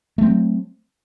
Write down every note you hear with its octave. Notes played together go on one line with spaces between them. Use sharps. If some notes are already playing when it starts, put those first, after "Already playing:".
F#3 A3 C4